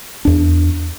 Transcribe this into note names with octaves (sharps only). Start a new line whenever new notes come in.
E2 D4